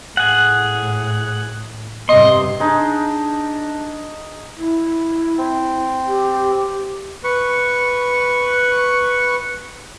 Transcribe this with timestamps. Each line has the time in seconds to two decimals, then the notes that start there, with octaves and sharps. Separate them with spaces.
0.17 A2 G#4 F#5
2.09 G2 C3 D#5 C6
2.60 D4 D#4 G#4
4.57 E4
5.38 C4
6.07 G4
7.24 B4 C#6